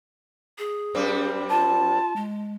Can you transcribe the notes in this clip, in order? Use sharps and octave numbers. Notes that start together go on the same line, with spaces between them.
G#4
F#2 G3 C4
F4 A5
G#3